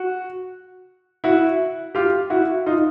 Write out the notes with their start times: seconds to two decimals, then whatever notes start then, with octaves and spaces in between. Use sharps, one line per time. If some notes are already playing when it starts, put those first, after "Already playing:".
Already playing: F#4
1.24 E4 F#4
1.95 F4 G4
2.30 E4 F#4
2.66 D#4 F4